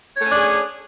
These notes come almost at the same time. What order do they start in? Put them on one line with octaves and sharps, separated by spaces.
C#5 A3 C#4 D4 G#4